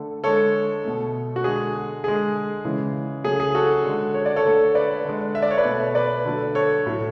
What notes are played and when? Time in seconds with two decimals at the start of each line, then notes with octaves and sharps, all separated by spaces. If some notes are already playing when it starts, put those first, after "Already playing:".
Already playing: D3 A3
0.24 D3 G#3 A4 C#5
0.84 B2 A3
1.36 F#4
1.44 D3 G#3 G#4
2.04 D3 G#3 G#4
2.65 C#3 E3 G#3
3.24 C#3 F#3 A3 G#4
3.40 G#4
3.55 F#4 A4
3.85 D3 G#3
4.14 C#5
4.26 D5
4.36 A4 C#5
4.45 D3 A3
4.75 B4 D5
5.05 D3 G#3
5.35 E5
5.42 D5
5.51 C#5
5.58 B4 D5
5.65 B2 A3
5.95 B4 D5
6.25 D3 F#3 A3
6.55 A4 C#5
6.86 A2 F#3 A3